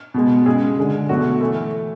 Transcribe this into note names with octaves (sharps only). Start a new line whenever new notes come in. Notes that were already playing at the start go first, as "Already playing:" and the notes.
B2 G#3
C#3 G#3 G#4
D3 G#3
B2 F#3 A3 F#4
E3 A3